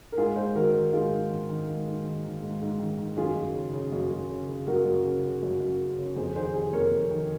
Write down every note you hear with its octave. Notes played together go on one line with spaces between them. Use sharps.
A#4
G#2 F4 G#4
G#2 G#4 C5
D#3 F#4 A#4
D#3
G#2 F4 G#4
G#2
D#3
D#3
G#2
G#2
D#3
D#3
G#2
G#2
D#3
D#3
F#2 F4 G#4
F#2
C#3
C#3
F#2
F#2
C#3
C#3
F#2 F#4 A#4
F#2
C#3
C#3
F#2
F#2
C#3
C#3
F2 G#4 C5
D#3 G#4 C5
C3 G#4 C5
F2 A#4 C#5
F2
D#3